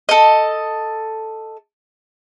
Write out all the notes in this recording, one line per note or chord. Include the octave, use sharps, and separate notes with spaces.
A4 D#5